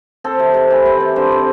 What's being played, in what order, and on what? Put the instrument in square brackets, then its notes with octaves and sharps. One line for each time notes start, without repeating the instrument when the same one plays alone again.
[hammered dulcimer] C4 A4
C3
C3
E3
C4
C3
D3 C5
C4